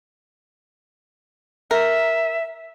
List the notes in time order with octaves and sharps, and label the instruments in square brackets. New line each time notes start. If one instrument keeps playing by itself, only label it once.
[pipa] A#4 [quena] E5